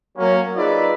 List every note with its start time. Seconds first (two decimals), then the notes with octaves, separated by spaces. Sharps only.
0.17 F#3 A#3 C#4
0.56 D#4 F4 G#4 B4 D5 E5